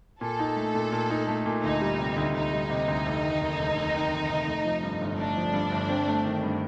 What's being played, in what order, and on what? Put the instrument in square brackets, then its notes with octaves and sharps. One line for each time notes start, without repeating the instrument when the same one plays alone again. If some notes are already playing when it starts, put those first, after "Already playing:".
[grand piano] A#2 [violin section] A4
[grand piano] D#4
A3
A#2
A#2
D#4
A3
A#2
[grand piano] D2 [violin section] D#4
[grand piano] G3
C3
D2
[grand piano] D2 [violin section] D#4
[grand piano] G3
C3
D2
F1
D#3
D#2
F1
F1
D#3
D#2
F1
A3
F3
G2
G1
[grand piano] A3 [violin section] D4
[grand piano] F3
G2
G1
C4
A3
D#3
G2